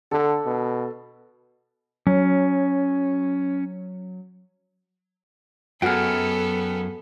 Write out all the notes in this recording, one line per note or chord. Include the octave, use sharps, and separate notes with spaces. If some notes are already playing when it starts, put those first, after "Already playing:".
D3 A4
B2
F#3 C#4
F#2 B3 F#4 G#4 A4 G5 F6